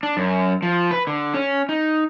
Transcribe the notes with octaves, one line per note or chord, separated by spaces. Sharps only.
D4
F#2
F3
B4
D3
C#4
D#4